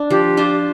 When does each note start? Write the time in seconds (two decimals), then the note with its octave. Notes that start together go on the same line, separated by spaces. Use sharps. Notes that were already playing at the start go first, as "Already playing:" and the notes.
Already playing: D4
0.10 F3 G4
0.37 D4 F4 C5